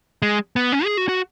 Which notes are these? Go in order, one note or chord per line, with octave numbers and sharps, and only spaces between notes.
G#3
B3
C#4
G#4
F#4
F#4